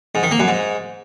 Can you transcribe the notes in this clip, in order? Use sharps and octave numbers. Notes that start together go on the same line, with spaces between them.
G#2
D#3
A#3
F#2
G#2